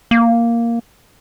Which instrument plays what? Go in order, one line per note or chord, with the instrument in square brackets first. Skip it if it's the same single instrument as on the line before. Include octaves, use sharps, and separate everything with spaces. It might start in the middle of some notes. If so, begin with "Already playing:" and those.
[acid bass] A#3